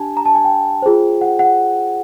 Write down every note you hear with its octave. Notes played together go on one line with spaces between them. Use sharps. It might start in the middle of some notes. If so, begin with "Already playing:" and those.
Already playing: D4 G4 G#5 A5
A#5
A5
G#5
G5
F4 G#4 C5
F#5
F#5